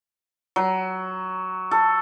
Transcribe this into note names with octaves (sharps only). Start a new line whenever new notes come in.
F#3
A4